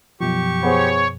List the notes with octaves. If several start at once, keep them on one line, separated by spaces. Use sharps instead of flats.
F#2 B2 F3 G4 C#6
B3 G#4 C5 C#5